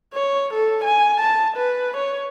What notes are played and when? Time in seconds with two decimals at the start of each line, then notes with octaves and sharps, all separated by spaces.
0.13 C#5
0.53 A4
0.84 G#5
1.20 A5
1.57 B4
1.97 C#5